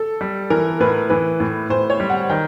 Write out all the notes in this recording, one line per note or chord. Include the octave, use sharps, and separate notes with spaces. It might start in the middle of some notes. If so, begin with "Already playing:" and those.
Already playing: A4
G3
E3 A#4
A2 B4
E3 B4
A2
A2 C5
C#5
G3
F#5
D#3 G5